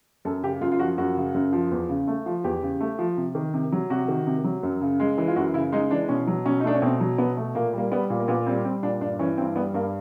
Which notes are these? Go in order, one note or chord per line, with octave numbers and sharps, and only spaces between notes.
F#2 A4
C#3 G4
F#2 F4
F4
F3 F#4
F#2 F#4
C#3
F#2
F3
E2
C#3
A3
F3
E2 G4
C#3
A3
F3
C3
D#3
C3
F#3
C3 F#4
D#3
C3
F#3
F#2
C#3
G#3
E3
F4
F#2 F#4
C#3 E4
G#3 D#4
E3 D4
B2 C#4
F#3
B2 C#4
D#4
A3 D4
C#4
B2 C4
F#3
B2 B3
A3
A#2 A#3
G3 A#3
G3 B3
A#2
A#3
A#2 B3
G3 C4
G3 C4
A#2 D4
G2 D4
E3 C#4
G2 C4
G3 B3
G2 A#3